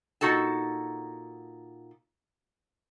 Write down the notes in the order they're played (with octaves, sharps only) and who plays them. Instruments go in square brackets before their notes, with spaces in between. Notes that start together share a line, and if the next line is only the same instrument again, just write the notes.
[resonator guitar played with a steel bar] A#2 D#4 F#4 A4 A5